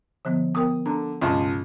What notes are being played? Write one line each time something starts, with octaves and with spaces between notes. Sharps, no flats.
D3 F3 B3
B3 A#4 G5 D#6
D3 A#5
C#2 G2 B2 D#5 A5